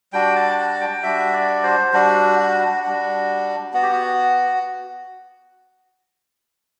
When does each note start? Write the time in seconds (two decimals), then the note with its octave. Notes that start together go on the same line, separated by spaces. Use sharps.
0.13 G3 D4 F#4 G5
0.36 A5
0.58 A5
0.81 G5
1.03 G3 D4 F#4 E5
1.33 D5
1.63 C5
1.93 G3 D4 F#4
2.39 F#4
2.84 G3 D4 F#4
3.73 B3 F#4
3.82 G4
3.92 F#4